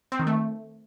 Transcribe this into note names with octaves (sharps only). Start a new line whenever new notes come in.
C4
D#3
A3